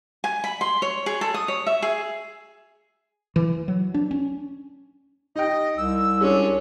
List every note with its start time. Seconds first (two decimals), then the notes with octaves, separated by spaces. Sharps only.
0.24 G#5
0.44 B5
0.61 C6
0.82 C#5
1.06 G#4
1.21 A4
1.34 D#6
1.48 C#5
1.67 E5
1.82 G#4
3.36 E3
3.68 F#3
3.94 D4
4.11 C#4
5.36 D#4 D#5 G5
5.77 C2 E6
6.21 G#3 C#4 D4